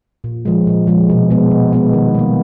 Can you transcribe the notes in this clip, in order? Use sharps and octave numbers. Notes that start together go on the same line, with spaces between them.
A#2
F3 G#3
A#2
F3 G#3
B2
G#3 B3
B2
G#3 B3
D#3
G3 A#3